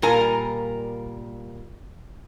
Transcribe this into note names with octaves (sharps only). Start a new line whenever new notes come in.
A#2 G3 F4 A#4 G#5